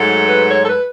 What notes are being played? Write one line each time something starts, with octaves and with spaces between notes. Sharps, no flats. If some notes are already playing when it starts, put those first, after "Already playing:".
Already playing: G#2 F#3 A3
B4
C#5
A4
B4